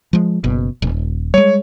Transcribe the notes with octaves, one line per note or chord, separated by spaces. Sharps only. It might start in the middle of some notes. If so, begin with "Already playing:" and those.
F3 G#3
F#1 B2
D#1
G3 G#3 C#5